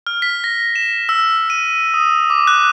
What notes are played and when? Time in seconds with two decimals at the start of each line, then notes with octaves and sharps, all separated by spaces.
0.07 F6
0.22 B6
0.44 A#6
0.76 E7
1.09 E6
1.50 D#7
1.94 D#6
2.30 D6
2.47 F#6